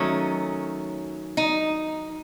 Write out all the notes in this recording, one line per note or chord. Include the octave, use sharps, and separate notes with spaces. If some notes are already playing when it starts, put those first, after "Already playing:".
Already playing: D#3 F#3 A3 C#4
D#4